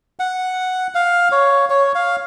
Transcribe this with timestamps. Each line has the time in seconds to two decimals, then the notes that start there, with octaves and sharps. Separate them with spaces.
0.20 F#5
0.95 F5
1.32 C#5
1.70 C#5
1.95 F5